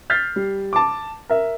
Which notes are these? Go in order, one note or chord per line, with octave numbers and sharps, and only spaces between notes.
F6 G6 A6 B6 C7
G3
A5 D6
A#4 E5